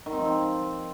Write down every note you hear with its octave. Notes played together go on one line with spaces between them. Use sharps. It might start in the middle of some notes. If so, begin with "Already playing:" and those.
D#3
C4
F3
C4